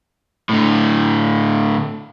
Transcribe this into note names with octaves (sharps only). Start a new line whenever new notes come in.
A2 D3